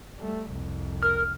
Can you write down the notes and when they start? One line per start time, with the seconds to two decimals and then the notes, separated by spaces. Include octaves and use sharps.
0.18 G3 A3
0.52 C2 F2
1.03 A#4 F6